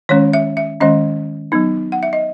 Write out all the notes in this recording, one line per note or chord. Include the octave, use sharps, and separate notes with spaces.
D#3 G#3 C#4 C#5
E5
E5
D#3 G#3 C#4 D#5
F#3 B3 D#4
F#5
E5
D#5